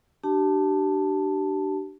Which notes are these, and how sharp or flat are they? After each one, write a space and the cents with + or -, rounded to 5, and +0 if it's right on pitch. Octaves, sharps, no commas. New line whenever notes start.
D4 +20 G4 -35 A5 +0